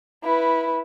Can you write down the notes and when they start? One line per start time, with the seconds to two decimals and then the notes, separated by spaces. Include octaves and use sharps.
0.24 E4 B4